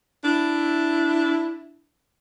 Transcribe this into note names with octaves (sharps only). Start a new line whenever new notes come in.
D4 E4